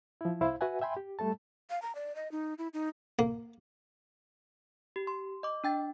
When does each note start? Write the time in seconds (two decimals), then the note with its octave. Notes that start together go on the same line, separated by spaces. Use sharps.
0.21 F3 E4
0.41 C2 E4 C5 F5
0.61 F#4 B4 E5 F#5 G#5
0.82 E5 G5 G#5 B5 C6
0.97 G4
1.19 G3 A3 A4 A5
1.70 F5
1.82 A#5
1.95 D5
2.16 D#5
2.32 D#4
2.58 E4
2.74 D#4
3.19 A#3
4.96 G4
5.07 C6
5.43 D#5 D6
5.64 D4 G5 A6